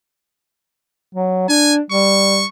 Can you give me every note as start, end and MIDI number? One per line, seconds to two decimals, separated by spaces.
1.15 1.46 54
1.49 1.80 62
1.49 1.74 80
1.91 2.43 55
1.91 2.46 85